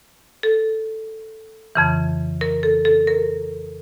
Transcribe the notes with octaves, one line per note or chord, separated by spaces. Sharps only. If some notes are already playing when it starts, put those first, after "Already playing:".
A4
F2 C#3 E3
A#4
A4
A4
A#4